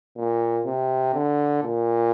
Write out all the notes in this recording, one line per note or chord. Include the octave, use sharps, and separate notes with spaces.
A#2
C3
D3
A#2